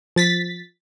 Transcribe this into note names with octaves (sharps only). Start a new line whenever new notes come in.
F3 A6 B6